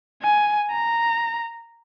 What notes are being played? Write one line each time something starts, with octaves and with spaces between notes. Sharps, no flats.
G#5
A#5